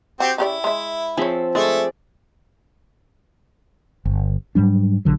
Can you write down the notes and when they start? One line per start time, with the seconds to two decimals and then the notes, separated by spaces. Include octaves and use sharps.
0.20 C4 F#4 G4
0.38 C#3 E4 G4 D5
0.64 G#3 E5
1.17 F3 C4 G#4 C#5 E5
1.55 G#3 A3 G#4 D5 E5
4.05 G1
4.55 G#2 F#3 G3 D4
5.05 A#1 D3 F#3